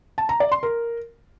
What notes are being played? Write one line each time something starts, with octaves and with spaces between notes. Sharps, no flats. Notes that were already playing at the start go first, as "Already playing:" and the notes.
A5
A#5
D5
C6
A#4